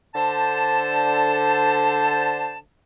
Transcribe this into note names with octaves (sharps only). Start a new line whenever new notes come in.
D3 C5 A5